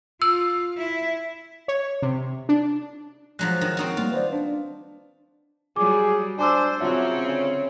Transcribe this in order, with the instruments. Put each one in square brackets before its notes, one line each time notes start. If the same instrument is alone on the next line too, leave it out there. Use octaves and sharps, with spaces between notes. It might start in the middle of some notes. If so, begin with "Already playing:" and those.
[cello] F4 [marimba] E6
[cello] E4 E5
[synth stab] C#5
C3
D4
[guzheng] F3 F#3 G#3 [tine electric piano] F#6
[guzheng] D#3
C4 D#4 F#4
[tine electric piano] G3 A#3 [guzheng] F4
[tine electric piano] B4 C5 D5
D4
[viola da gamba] F#3 G3 [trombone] G#4 [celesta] D6
[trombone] D4 [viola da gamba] C5 [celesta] G#5 D6 E6
[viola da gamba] C#3 C4 C#4 [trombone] F#3 [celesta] F4 E5
[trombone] D3